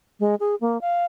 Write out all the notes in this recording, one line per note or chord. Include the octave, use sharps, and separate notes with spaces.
G#3
G#4
A#3
F5